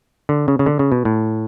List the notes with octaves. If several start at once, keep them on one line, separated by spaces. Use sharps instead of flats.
D3
C#3
C#3
D3
C#3
B2
A2